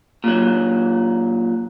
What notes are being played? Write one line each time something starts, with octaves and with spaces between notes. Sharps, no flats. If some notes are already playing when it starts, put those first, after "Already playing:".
A#2 F#3